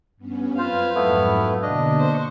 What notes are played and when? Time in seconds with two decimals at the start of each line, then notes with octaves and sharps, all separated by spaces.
0.17 G2 B3 C#4
0.58 F#2 C4 F4 B4 C5 F5 G#6
0.95 F2 G#2 F#3 A3 B3 E4
1.62 B2 D3 A#3 D4 D#5
2.00 C5 C#6